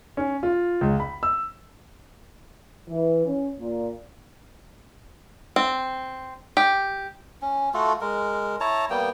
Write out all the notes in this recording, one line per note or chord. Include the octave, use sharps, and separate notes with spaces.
C#4
F4
C#2
B5
E6
E3
C#4
A#2
C4
G4
C#4
A3 F4 F#4 A4
G#3 A#4
E4 C#5 A5 A#5
G3 A#3 B3 G5